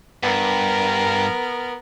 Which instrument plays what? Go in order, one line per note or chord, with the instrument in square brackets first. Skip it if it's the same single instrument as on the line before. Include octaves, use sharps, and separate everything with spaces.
[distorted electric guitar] G2 [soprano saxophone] B3 [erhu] A#4